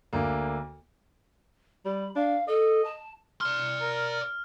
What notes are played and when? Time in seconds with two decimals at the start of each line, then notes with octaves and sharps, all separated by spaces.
0.13 D2 D3 A#3
1.85 G3 B5
2.16 D4 F5
2.48 A4 D#5
2.84 A5
3.41 D5 C6 F6
3.81 A#4